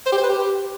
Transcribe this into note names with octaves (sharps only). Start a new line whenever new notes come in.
C5
G4
C5
B4
G4